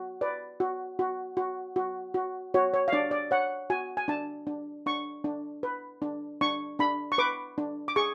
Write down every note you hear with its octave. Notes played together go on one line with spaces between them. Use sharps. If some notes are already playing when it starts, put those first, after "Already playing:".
Already playing: F#4
B4 D5
F#4
F#4
F#4
F#4
F#4
F#4 C#5
C#5
F5
D4 D5
D5
C#5 F#5
F#4 G#5
G#5
D4 A5
D4
D4 C#6
D4
B4
D4
D4 C#6
D4 B5
C#6
B4 D6
D4
D6
G#4 C#6